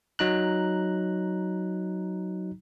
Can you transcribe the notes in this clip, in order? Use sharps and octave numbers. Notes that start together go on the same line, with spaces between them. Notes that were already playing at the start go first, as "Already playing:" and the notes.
F#3 D#4 A#5 F#6